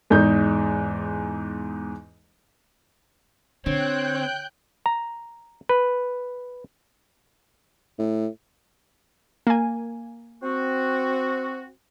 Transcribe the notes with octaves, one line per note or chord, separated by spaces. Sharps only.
E2 G#2 D#4 G6
D3 C4 C#5 G5 F#6 G6
A#5
B4
A2
A#3 G#5
C4 F#4